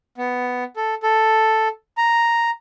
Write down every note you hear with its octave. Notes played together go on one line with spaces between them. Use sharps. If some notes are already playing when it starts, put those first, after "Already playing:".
B3
A4
A4
A#5